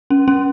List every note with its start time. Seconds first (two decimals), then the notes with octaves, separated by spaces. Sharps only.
0.10 C#4
0.28 C#4